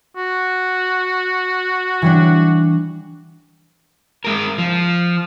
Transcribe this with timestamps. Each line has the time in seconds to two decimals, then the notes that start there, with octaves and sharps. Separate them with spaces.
0.16 F#4
2.02 E3 G3 D4
4.24 G#3 A#4
4.58 F3